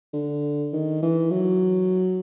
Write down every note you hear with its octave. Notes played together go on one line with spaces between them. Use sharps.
D3
D#3
E3
F#3